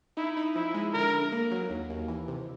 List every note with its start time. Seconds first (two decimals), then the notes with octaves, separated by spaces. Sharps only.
0.17 D#4 E4
0.37 D#4
0.55 F3 E4
0.74 G#3
0.93 D3 A#4
1.13 D3
1.32 A#3
1.51 F#3
1.70 D#2
1.90 D#2
2.08 E3
2.28 C3